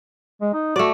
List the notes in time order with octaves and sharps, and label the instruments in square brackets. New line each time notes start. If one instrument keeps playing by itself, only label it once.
[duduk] G#3
D#4
[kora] A3 D5 [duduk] F#4